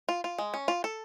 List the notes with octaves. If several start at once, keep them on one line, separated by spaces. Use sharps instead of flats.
F4
F4
G#3
C#4
F4
A4